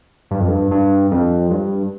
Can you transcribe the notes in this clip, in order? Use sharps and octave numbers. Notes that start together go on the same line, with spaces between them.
G2
F2
G2
G2
F2
G2